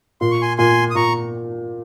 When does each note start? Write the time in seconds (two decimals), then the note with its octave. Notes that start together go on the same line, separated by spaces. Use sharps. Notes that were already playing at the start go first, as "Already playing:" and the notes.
0.21 A#2 C6
0.31 C#6
0.41 G#5 C6
0.58 A#2 G#5 C6
0.90 D#6
0.95 A#2 A#5 C#6